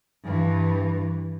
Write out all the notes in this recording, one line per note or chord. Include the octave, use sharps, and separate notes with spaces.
G2 E3